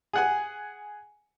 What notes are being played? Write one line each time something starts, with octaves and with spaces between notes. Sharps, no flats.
G#4 F#5 G#5